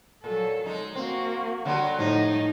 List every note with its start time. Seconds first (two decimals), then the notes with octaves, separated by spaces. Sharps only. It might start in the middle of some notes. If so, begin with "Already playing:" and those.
0.24 A#2 F#3 A4
0.66 G#3 D#4
0.95 A#3 C4 F#4
1.65 D3 F#3 G3
1.99 A2 F3 D#4